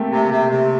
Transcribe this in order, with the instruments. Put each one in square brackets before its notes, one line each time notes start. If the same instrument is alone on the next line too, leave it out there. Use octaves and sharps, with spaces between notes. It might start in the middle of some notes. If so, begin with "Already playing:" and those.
Already playing: [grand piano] A3 A#3 C4 G4
[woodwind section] C3
C3
C3